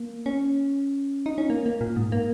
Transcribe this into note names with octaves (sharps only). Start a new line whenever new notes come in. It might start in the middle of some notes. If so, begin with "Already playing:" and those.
Already playing: A#3
C#4
D#4
C#4
A#3
A#3
A#2
G#2
A#3